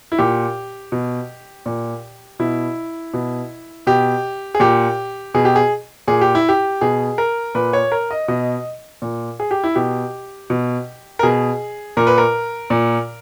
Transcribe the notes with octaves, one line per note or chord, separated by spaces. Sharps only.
E4
A#2 G4
B2
A#2
B2 E4
B2
B2 G4
G#4
A#2 G4
B2 G#4
G4
G#4
A#2 G#4
G4
E4
G4
B2 G#4
A#4
A#2 B4
C#5
A#4
D#5
B2 D#5
A#2
G#4
G4
E4
B2 G4
B2
A#4
B2 G#4
A#2 A#4
B4
A#4
A#2